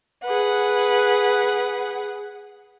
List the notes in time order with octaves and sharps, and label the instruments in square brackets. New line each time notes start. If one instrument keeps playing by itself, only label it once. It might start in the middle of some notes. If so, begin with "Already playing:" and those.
[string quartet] G#4 B4 F#5